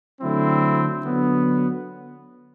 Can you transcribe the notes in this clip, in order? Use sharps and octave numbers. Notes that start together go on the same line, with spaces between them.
D3 F#3 A3 C4 E4
D3 F#3 B3